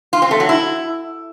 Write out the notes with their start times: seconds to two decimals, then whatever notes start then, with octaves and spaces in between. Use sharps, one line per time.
0.13 F4
0.22 C4
0.31 A3
0.40 F#3
0.49 E4